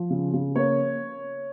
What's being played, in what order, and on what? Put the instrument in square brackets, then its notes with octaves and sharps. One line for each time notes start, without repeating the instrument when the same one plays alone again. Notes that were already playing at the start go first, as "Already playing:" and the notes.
Already playing: [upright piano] F3
C#3
C#3
A#3 C#5